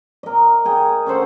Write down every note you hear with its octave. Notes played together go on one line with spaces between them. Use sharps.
A#4 D#5
G#4 G5
C#4 A4 C5 F#5